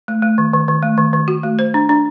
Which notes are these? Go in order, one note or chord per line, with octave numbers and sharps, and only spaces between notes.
A3
A3
D#3
D#3
D#3
A3
D#3
D#3
F#4
A3
C5
D4
D4